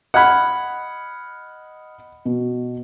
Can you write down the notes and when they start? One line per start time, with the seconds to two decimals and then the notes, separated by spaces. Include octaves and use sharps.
0.14 D#5 F#5 B5 F6 G#6
2.25 B2